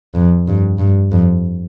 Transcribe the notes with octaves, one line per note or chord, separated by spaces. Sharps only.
F2
G2
G2
F2